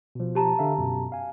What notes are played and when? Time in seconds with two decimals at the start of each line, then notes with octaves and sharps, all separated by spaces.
0.15 B2 F3
0.35 G4 A5 A#5
0.59 D3 E5 F5
0.78 F#2 B2
1.12 F5 G#5